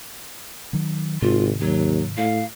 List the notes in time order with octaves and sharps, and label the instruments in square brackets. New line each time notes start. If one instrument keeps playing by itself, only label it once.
[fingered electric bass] D#3 F#3
[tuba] G#1 [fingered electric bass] G#2 C3 D#3 [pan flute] F4
[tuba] D#2 [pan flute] F#3
[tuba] A2 [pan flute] F5